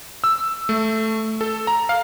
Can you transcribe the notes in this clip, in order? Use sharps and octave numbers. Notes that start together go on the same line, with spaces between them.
E6
A3
A4
A#5
F5